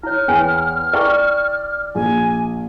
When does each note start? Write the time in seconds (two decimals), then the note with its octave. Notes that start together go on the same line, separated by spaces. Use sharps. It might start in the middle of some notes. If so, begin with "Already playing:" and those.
0.03 E4 C#5 F6
0.28 E2 C#5 G5 G#5
0.93 E4 D5 G5 C#6
1.95 A#1 G#5